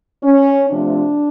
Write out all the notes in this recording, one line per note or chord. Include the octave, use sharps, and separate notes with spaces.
C#4
C3 F3 A3 D4